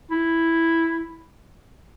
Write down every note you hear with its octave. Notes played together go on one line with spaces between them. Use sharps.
E4